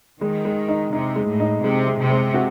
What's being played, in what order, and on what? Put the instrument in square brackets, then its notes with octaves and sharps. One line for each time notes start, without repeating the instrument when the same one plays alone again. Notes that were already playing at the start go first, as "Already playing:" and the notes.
[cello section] D#3 [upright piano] G#3
[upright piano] G#3
D#4
[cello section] C3 [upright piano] D#4
[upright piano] G#3
[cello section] A2
[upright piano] D#4
[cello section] C3 [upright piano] G#3
[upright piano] G#3
[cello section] C3
[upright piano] G#3
F#4